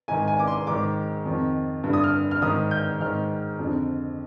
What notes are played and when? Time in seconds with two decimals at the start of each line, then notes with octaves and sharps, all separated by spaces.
0.08 G#2 D#3 G#5
0.28 G#5
0.39 D6
0.47 C6
0.67 G#2 D#3 D6
1.25 F2 D#3
1.84 G2 D3
1.93 D#6
2.04 F6
2.31 F6
2.42 G#2 D#3 D#6
2.71 G6
3.00 G#2 D#3 F6
3.59 F2 D3